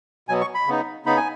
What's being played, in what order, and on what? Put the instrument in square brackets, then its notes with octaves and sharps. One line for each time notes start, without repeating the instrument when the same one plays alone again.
[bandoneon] B2 F#3 B3 G#5
C#6
B5
C#3 B3 D#4
C#3 B3 D#4 B5
G#5